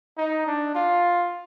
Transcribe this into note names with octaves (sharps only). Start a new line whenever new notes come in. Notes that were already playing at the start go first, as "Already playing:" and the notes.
D#4
D4
F4